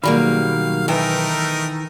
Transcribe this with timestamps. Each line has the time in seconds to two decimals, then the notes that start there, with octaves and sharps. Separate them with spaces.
0.04 B1 D#3 F#3 G3 A#3 G#4 F5 B5
0.88 E3 A3 D#4 A#4 G5